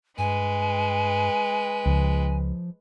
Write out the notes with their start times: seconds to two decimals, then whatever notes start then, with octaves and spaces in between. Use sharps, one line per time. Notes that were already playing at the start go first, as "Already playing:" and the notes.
0.18 G2 G#3 B4 G#5
1.86 C#2 F3